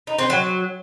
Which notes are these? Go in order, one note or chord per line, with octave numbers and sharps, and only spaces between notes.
D#4
C4
F#3